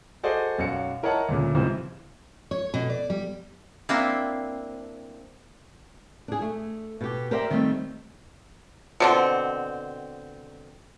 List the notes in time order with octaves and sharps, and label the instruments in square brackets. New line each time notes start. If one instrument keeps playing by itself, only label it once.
[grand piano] F#4 G#4 A4 C5 D5 D#5
B1 F#2 F#4 F5 C#7
E4 A#4 C#5 D#5 F#5 A5
D2 A#2 C#3
C#2 G#2 C3 E3 F3 C4
[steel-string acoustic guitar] C#5
B2
D5
G3
[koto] A#3 C4 D4 E4
[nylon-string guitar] D4 G#4
A3
B2 G4
G4 A#4 C5 D5 E5 G5
D#3 G3 A3 C4
[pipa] B2 D3 C4